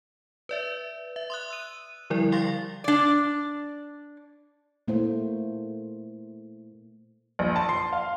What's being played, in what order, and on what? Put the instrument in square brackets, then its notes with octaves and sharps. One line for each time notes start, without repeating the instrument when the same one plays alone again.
[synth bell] B4 D5 E5
E5
C6 D#6 F#6
E6 D#7
D3 F3 G3 E4 A#4 D5
F5 G5 C6 C#6 A6 A#6
[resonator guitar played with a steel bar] D4 D5
[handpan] A#2 A3 A#3 E4 C5
[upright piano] A#1
A5
C6
F5